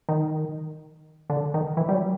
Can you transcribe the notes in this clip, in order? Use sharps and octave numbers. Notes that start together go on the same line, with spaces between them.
D#3
D3
D#3
E3
G3
F#3